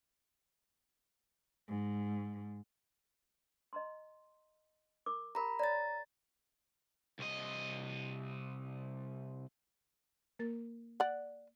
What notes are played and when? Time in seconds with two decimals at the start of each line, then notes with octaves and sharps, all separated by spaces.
1.68 G#2
3.73 D#5 A#5 C6
5.06 A#4 D6
5.35 G4 A#4 A#5 B5
5.59 C#5 D5 A#5 A6
7.19 C2 D#5
10.39 A#3 A#4 A6
11.00 D5 F#5